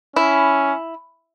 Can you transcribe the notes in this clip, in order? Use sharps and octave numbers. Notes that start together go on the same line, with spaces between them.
C#4 E4